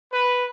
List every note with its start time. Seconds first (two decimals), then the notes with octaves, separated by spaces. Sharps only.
0.13 B4